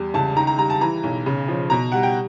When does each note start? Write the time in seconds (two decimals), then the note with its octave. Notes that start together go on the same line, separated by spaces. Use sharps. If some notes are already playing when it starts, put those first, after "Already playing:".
Already playing: E2 G3
0.14 C#2 A5
0.36 D#3 A#5
0.47 A#5
0.58 G3 A#5
0.70 A5
0.81 E3 A#5
1.03 B1
1.26 C#3
1.48 F3
1.70 B2 A#5
1.92 G3 F#5
2.03 G5